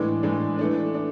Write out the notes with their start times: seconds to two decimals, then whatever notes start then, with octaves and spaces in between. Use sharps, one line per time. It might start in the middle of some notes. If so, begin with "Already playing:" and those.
Already playing: A2 E3 G#3 D4
0.23 A2 E3 G#3 D4
0.59 E3 A3 D4
0.94 D4